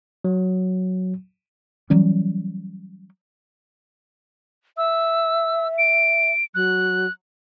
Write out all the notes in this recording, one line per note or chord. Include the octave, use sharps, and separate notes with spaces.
F#3
E3 F#3 G3 C#4
E5 E6
D7
F#3 F#6